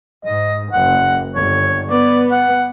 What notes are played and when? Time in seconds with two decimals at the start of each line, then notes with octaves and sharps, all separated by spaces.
0.25 G#2 D#5
0.73 F#1 F#5
1.35 G1 C#5
1.90 B3 D5
2.31 F#5